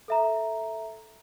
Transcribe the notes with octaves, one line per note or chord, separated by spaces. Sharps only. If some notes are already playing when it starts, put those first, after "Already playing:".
A4 E5 A#5